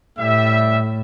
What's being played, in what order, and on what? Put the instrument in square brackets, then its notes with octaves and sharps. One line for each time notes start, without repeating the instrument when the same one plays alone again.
[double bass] A2 [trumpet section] G3 E5